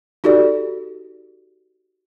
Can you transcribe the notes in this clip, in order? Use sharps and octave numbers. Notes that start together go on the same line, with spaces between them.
D#4 F#4 G4 A4 D5